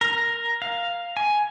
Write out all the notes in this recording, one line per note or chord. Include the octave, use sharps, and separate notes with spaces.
A#4
F5
G#5